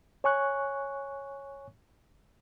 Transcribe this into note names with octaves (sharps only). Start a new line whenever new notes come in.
C#5 G#5 C#6 F#6